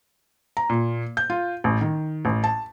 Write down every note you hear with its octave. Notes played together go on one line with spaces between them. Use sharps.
A#5
A#2
G6
F4
A1
D#3
A1
A5